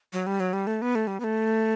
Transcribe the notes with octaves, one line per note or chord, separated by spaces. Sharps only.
F#3
G3
F#3
G3
A3
B3
A3
G3
B3
A3